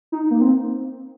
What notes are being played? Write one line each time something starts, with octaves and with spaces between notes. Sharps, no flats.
D#4
A#3
C4